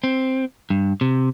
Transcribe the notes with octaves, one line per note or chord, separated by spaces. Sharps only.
C4
G2
C3